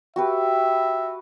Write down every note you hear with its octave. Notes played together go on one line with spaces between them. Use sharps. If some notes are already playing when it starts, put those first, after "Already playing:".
F#4 G4 B4 E5